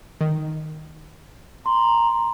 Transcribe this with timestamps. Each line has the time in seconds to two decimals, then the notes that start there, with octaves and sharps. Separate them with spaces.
0.21 D#3
1.66 A#5 C6